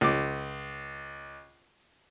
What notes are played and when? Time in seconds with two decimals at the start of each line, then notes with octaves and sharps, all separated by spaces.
0.01 C#2 D6